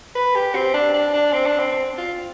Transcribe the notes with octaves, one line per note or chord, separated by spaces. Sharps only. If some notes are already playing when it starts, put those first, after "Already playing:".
B4
G4
C4
D4
D4
D4
C4
D4
C4
C4
F4